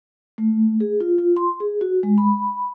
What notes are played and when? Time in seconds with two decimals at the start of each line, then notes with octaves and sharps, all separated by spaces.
0.38 A3
0.80 G#4
1.00 F4
1.18 F4
1.37 C6
1.60 G#4
1.81 F#4
2.03 G#3
2.18 B5